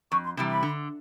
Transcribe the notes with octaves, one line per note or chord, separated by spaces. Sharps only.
F2 C#6
C6
C3 E3 G3 B5
B5
D3